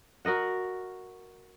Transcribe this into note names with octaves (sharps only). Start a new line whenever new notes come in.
F#4 A#4 D#5 F#5